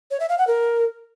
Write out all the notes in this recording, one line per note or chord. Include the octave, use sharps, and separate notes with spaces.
C#5
E5
F5
F#5
A#4